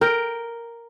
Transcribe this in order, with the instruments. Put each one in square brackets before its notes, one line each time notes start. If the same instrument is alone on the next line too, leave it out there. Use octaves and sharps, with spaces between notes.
[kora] A#4 G5